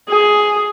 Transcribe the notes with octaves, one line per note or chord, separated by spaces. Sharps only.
G#4